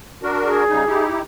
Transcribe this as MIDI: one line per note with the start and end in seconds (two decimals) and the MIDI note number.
0.23 0.64 62
0.23 0.64 66
0.23 0.64 70
0.43 1.05 68
0.69 0.84 49
0.69 0.84 55
0.69 0.84 63
0.87 1.22 63
0.87 1.22 64
0.87 1.22 67